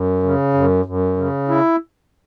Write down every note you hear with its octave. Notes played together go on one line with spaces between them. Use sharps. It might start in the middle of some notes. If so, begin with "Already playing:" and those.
Already playing: F#2
C#3
F#2
F#2
C#3
E4